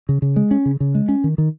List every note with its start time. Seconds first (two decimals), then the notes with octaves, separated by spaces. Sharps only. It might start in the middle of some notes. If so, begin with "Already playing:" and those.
0.09 C#3
0.22 C#3
0.36 G#3
0.51 C#4
0.66 C#3
0.80 C#3
0.95 G#3
1.09 C#4
1.24 D#3
1.38 D#3